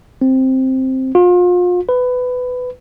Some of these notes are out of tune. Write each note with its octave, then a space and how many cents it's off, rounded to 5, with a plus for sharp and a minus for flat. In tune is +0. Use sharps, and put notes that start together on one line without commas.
C4 +5
F4 +35
B4 +15